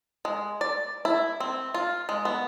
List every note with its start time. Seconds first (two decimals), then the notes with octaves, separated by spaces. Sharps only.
0.25 G#3
0.61 D5
1.05 E4
1.40 C4
1.74 F4
2.09 G#3
2.25 B3